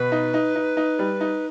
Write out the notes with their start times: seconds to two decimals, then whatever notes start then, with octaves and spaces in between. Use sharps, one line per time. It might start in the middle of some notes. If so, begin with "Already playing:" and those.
Already playing: B2 B4
0.12 D#4
0.34 D#4
0.55 D#4
0.77 D#4
0.99 G3
1.21 D#4